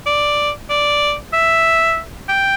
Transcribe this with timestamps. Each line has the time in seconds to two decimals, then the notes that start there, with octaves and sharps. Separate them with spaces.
0.06 D5
0.70 D5
1.33 E5
2.29 G5